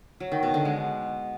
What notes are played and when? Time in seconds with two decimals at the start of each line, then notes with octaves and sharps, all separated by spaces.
0.20 F#3
0.32 D#3
0.43 B2
0.54 D3
0.65 G#3